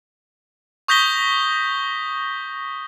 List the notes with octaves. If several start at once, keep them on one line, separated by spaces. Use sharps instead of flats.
C#6 D#6 G6 A#6 B6 G7